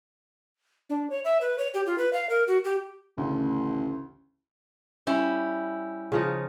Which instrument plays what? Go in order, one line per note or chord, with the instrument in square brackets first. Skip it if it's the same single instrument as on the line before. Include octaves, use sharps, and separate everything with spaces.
[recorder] D4
C#5
E5
B4
C#5
G4
F4
B4
F5
A#4
F#4
G4
[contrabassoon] A1 [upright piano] D2 C#3
[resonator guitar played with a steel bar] G3 C#4 E4
[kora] C#3 F3 D#4